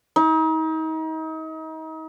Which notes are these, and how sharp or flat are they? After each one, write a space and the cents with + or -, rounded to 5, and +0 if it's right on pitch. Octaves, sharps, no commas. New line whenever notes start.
D#4 +35